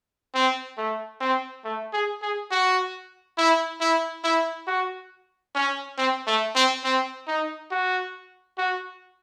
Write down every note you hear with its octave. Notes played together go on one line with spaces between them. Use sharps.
C4
A3
C4
A3
G#4
G#4
F#4
E4
E4
E4
F#4
C#4
C4
A3
C4
C4
D#4
F#4
F#4